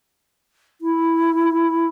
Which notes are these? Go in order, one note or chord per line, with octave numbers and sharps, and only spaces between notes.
E4